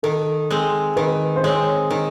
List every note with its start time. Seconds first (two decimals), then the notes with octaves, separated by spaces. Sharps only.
0.03 D#3 A4
0.51 G#3 C4
0.96 D#3 B4
1.36 C5
1.44 G#3 C4 C#5
1.91 D#3